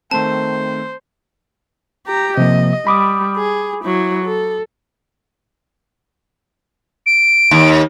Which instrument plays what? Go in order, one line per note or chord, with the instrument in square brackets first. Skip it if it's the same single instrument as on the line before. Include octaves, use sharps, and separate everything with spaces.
[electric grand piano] D#3 A3 C4 [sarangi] C5 [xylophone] A5
[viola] G4 A#5
[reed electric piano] C3 F3 A#3 [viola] D#5
[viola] G3 [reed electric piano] B5 D6 D#6
[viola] G#4
F#3 E4
A4
[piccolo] D7
[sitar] D#2